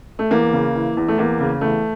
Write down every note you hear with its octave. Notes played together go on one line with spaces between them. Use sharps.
A3
E2 A#3
C#3
E3
E2
A3
E2 A#3
C#3
E2 A3